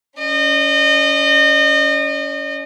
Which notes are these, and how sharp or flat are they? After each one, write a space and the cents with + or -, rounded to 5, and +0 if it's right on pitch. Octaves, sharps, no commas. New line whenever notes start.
C#4 +20 D#5 -30